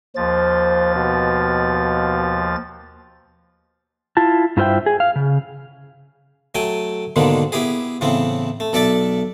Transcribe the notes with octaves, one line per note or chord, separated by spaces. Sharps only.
D#2 F3 C5 A6
B2
E4 F4 A5
G2 E4 F4 C5 E5 G5
G#4
F5
C#3
F#3 A3 G5 G#5
G#2 B2 D3 D#3 G#3 A#3
B3 E4 G4 G#4
A2 C#3 E3 B3 C4
A3
B1 A4 D5 E5 A5